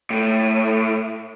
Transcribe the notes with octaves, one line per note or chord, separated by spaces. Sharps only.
A2